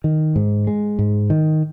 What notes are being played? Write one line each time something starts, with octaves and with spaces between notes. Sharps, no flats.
D#3
G#2
G#3
G#2
D#3